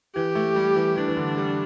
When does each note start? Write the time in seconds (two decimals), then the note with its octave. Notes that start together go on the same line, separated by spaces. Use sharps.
0.15 E3 G4
0.35 A3
0.56 G3
0.76 E3
0.96 E3 D4
1.08 E3
1.17 D3
1.37 G3